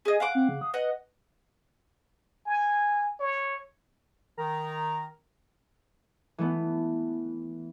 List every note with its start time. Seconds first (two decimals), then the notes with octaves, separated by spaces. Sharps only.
0.05 G#4 D#5 G#5
0.20 F5 F#5 D6
0.35 C4
0.49 C#3
0.61 D#6
0.74 B4 D#5 F#5
2.46 G#5
3.20 C#5
4.38 D#3 A#4 A#5
6.38 E3 A3 B3